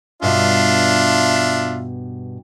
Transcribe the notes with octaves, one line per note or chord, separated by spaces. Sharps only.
G2 B2 D4 F4 E5